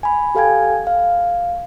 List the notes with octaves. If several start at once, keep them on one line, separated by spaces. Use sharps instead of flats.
G#5 B5
G4 A4 F5 G5 G#5 G#6
F5